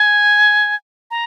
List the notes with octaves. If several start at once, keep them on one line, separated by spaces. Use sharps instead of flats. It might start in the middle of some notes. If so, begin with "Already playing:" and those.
Already playing: G#5
A#5